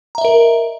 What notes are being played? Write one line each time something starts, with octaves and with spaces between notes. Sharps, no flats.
A#4 D#5 E5 A#5